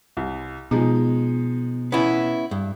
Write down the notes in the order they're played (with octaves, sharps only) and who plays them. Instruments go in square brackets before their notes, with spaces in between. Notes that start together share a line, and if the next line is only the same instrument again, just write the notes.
[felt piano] C2
[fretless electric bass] B2 [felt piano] F3 G#3 D#4
[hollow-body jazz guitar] B3 C#4 E4
G2